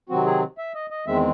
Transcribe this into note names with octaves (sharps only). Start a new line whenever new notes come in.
C3 D#3 F#3 C4 F#4
G#4
E5
D#5
D#5
E2 D#3 G#3 C4 E5